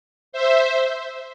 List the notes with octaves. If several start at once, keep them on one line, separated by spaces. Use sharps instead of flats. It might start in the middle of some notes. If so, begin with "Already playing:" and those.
C5 E5